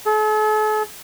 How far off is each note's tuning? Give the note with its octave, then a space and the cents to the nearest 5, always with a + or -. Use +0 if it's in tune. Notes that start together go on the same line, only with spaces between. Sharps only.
A4 -45